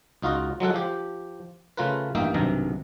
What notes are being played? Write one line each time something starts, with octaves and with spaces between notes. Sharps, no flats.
C#2 D#4 F4 F#4 D#5
F#3 G#3 A4 F#5
F3 G4
C#3 A3 F4 A#4 B4
A1 G2 A#3 D#4 E5 G5
B1 G2 C3 D#3 A#5